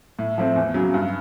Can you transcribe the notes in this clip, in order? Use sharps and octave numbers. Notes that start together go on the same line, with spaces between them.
A2
F3 A3 C4
E2
C#3 F#3
G2